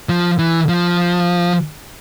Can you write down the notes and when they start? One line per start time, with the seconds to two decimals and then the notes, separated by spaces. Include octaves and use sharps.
0.09 F3
0.39 E3
0.69 F3